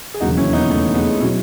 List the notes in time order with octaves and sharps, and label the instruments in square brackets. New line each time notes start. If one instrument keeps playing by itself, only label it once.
[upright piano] G#4
[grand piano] E1 D#2 C#3 F#3 [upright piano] D#4 F#4
[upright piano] C#4 E4
B3 D#4
A3 C#4
G#3 B3
[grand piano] B2 F#3 [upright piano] C#4 E4